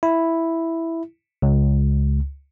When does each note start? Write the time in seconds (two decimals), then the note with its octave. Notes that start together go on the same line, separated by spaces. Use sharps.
0.03 E4
1.42 C#2